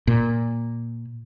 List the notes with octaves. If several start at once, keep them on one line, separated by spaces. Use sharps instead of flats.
A#2